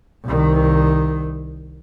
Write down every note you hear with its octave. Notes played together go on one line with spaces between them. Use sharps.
C2 D#3